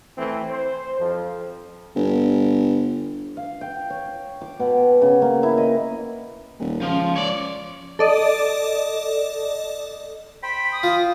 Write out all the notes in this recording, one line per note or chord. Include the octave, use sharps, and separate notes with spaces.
A2 E3 A3 C4
C5
F2 F3
G1
F5
G5
C#5
D6
B2
C#3
A#3
E4
D#5
D#1
C#2 F3
C#5 D5
A4 D5 D#5
C5 G5 B5 B6
D#6
F4